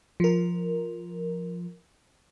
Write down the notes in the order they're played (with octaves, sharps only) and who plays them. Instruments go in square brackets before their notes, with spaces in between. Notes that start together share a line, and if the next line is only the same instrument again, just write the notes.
[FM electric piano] F3 A#4